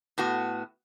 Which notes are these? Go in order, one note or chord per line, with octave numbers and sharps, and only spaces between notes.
A2 B3 F#4